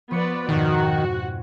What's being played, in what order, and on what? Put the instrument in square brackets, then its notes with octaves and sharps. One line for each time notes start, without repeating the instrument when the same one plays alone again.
[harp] F3 C#6 C#7 [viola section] B3 B4 D5
[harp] F2 G#2 B2 [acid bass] D#3 [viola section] F#4